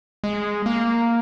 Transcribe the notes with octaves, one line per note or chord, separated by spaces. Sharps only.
G#3
A#3